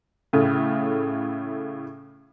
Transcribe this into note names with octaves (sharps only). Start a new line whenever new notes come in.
A2 C#3 A3